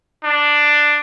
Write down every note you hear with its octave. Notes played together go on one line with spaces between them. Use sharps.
D4